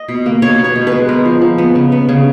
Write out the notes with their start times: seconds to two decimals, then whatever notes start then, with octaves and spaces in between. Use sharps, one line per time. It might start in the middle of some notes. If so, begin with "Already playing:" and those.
Already playing: D#5
0.08 B2
0.26 A#3
0.42 B2 C#5
0.58 B3
0.64 C#5
0.76 B2
0.87 B4
0.92 G#3
1.09 B3 A#4
1.25 F3
1.41 F3
1.58 B3
1.75 C#3
1.92 B3
2.09 C#3